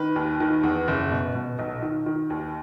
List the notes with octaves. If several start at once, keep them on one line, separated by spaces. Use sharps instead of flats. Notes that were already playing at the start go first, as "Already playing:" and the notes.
Already playing: D#3 B4
D#2
D#3
E2
F#1
B2
B2
B1
D#3
D#3
D#2